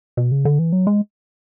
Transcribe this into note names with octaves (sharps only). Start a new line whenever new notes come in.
B2
C#3
D3
E3
F#3
G#3